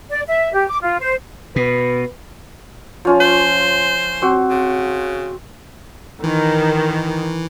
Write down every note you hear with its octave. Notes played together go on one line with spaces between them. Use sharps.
D5
E5
G4
D6
F4
C5
B2 B4
F3 C#4 F4
C5
C4 F#4
C#3
D#3 E3